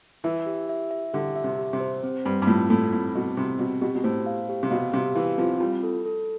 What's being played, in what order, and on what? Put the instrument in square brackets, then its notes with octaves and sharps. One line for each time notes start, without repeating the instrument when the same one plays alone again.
[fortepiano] E3 [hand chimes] E5
[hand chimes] G4
E5
E5
[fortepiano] D3 [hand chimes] G4
[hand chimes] E5
[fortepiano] C3
[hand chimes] G4
[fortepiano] C3
[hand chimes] C5
C4
[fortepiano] G2 [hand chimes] C4
[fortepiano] G2
[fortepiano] A2 [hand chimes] F4
[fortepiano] A2 [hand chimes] A4
[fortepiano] A2 [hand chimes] C4
[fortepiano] B2 [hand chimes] C4
[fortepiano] C3 [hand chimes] C4
[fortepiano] B2 [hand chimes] C4
[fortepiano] B2 [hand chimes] G4
[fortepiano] B2
[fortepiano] A2 [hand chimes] C5
[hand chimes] F5
G4
[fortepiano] C3
[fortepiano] B2 [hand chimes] F5
[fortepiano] C3 [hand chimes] G4
[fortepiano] E3 [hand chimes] F5
[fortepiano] F3 [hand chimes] C4
[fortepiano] G3 [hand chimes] F4
[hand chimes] A4
A4